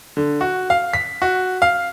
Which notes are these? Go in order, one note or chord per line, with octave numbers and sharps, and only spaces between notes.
D3
F#4
F5
B6
F#4
F5